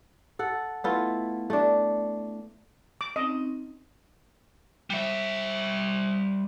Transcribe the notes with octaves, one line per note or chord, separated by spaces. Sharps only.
A4 F#5
A3 B3 E4 F4
A3 D4
D6
C4 C#4 D#4 D#5
G3 E5